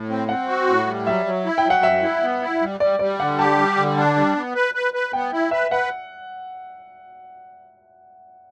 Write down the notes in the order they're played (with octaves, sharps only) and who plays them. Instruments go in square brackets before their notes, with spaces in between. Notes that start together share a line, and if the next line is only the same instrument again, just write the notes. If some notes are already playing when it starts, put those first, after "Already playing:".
Already playing: [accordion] A2
C4
[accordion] C4 [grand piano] F#5
[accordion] F#4
A2
G3
[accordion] F#3 [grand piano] E5
[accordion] F#3
E4
[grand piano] G5
[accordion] F#3
[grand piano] F#5
[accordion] F#2 [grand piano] E5
[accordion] E4
B3
E4
G3
[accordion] G3 [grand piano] D5
[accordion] G3 [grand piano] D5
[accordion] D3 [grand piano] F#5
[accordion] G4 [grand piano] A5
[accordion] G3
D3
D4
G3
B3
B4
B4
B4
[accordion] B3 [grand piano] G5
[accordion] E4
[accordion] B4 [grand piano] E5
[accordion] B4 [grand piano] F#5